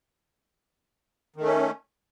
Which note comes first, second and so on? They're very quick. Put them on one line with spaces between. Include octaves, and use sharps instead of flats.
D#3 A3 C#4